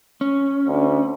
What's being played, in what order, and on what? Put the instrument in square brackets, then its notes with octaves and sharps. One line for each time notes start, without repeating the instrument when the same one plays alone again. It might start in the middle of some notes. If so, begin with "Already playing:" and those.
[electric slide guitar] C#4
[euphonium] D2